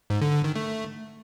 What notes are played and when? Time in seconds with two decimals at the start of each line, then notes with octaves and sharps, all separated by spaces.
0.10 G#2
0.21 D3
0.33 D3
0.44 D#3
0.55 A3